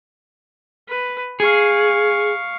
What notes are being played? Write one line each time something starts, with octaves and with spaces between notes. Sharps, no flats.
B4
G#4 F5 C#6